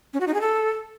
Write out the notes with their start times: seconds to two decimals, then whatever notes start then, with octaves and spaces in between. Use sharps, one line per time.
0.13 C#4
0.20 F#4
0.27 D#4
0.34 G#4
0.41 A4